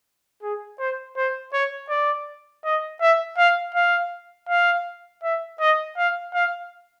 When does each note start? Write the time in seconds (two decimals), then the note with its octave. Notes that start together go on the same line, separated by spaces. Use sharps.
0.42 G#4
0.79 C5
1.17 C5
1.53 C#5
1.90 D5
2.64 D#5
3.01 E5
3.38 F5
3.75 F5
4.49 F5
5.23 E5
5.60 D#5
5.97 F5
6.34 F5